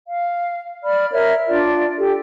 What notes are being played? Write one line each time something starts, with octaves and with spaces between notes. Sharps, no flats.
F5
D5 B5 F6
A#4 C#5 E5 F6
D4 F4 D5
G4 A4